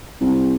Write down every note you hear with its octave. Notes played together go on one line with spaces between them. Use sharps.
C2